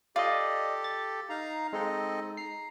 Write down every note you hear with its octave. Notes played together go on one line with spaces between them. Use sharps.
F4 G4 A4 D5 D#5
A6
D#4 F5 A#5
G#3 C4 D#4 A4 D#5
A#5 C7